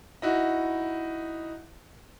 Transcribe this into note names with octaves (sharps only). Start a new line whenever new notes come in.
D#4 E4 F#4